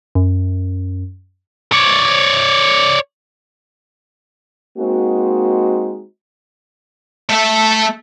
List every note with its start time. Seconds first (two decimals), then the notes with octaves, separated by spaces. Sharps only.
0.15 F#2
1.72 C#5 D5
4.78 G#3 A#3 C4 D#4 F#4
7.29 A3 E5